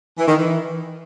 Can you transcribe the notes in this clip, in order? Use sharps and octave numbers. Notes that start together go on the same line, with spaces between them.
E3
D#3
E3